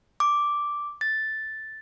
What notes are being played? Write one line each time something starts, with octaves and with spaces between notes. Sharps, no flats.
D6
A6